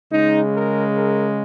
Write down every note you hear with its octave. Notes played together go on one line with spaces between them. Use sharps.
C#3 G#3 D#4
A#4
A#4